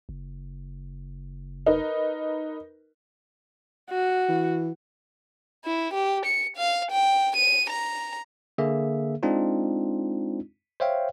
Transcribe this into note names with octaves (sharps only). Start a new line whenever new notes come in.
F#1
D#4 A#4 B4
F#4
E3
E4
G4
C#7
F5
G5
D#7
A#5
D3 A#3 G#4 E5
G#3 C4 D4 D#4 F4
C5 C#5 E5 F5 G5